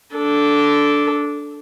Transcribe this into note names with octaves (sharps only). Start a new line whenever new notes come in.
D4 A4